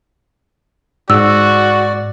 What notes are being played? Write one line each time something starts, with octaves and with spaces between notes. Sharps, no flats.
G#2 F#4 D5 E6